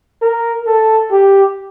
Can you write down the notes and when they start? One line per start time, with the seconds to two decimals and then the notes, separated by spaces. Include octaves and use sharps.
0.22 A#4
0.66 A4
1.11 G4